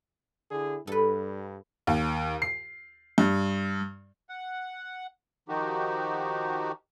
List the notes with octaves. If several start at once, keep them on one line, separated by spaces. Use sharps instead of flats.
D3 E4 G#4
G2 A4 B4
D#2
C7
G2
F#5
D#3 F3 D#4 F#4 G4